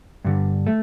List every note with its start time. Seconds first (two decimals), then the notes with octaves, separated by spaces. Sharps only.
0.24 G2 D3
0.66 A3